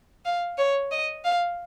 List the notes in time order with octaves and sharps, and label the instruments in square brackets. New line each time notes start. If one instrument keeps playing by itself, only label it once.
[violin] F5
C#5
D#5
F5